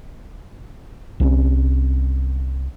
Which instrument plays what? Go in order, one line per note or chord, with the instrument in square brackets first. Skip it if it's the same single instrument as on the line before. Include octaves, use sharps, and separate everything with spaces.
[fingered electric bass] C2 C4 C#4